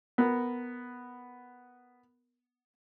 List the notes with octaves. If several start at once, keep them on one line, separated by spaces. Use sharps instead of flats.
B3 A#4